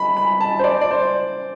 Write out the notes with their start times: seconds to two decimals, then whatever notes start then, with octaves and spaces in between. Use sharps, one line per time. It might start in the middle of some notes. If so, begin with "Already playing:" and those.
Already playing: B5
0.17 B5
0.40 A5
0.59 C5
0.64 D5
0.81 D5
0.91 C5